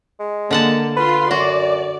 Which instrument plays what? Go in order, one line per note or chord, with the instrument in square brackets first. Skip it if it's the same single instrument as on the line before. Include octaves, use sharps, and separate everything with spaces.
[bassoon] G#3
[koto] D3 F#5 A5 [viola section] A#3
[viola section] F4 C6 [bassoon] B4
[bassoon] F#2 [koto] F#4 [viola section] D5